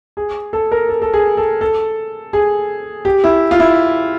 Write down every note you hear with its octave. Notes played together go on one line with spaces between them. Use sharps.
G#4
A4
A#4
A4
A4
G#4
A4
A4
G#4
G4
E4
F4
E4